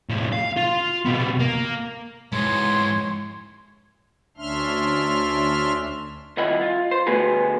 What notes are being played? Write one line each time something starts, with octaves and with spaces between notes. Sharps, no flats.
A2 F3
F5
F4
C3 B3
A#3
G#2 E3 G#3 C#5 C6
D2 C#4 D4 E5 C6 F6
C2 D#3 E4 F4 D#5 F#5
F4
C5
D3 A3 B3 F#4 G#4 B4